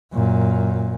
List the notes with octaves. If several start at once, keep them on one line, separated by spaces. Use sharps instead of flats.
F#2 A#2